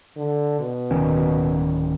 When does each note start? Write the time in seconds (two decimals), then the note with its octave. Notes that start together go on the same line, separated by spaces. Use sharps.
0.17 D3
0.60 B2
0.91 D1 D#3 C#4